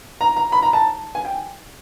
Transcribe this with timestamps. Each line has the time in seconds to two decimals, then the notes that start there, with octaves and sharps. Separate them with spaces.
0.21 A#5
0.36 A#5
0.52 B5
0.62 A#5
0.73 A5
1.15 G#5
1.25 G5